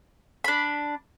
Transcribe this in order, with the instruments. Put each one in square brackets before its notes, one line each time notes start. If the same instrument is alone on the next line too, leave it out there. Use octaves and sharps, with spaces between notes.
[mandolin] D4 B5